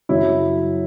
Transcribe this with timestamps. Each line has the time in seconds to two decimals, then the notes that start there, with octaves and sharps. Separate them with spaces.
0.09 F#2 C#3 F#3 C#4 E4